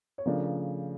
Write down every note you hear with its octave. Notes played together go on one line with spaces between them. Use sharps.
C#5
C#3 F3 A3 D4 A#4